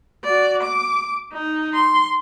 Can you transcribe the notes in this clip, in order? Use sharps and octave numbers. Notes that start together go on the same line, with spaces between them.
F#4 D5
D6
D#4
C6